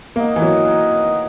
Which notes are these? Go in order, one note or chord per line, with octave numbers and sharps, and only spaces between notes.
A#3 D#4 A#4 D#5 F#5
E3
F#3